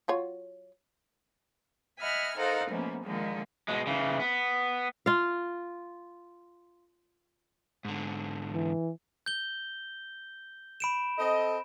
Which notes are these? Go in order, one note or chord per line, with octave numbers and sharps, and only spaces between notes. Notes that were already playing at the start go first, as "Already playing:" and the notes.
F#3 F4 C#5
D#5 E5 F#5 G#5 B5 F6
D#4 A4 A#4 C5 F5 F#5
G#2 B2 F3 A3 A#3 C#4
A#2 D3 D#3 F3 G#3 A#3
B2 G#3
C#3 E3
B3
F4 F5
G#2 D3
E3
G6 G7
B5 D7 E7
C4 A4 D#5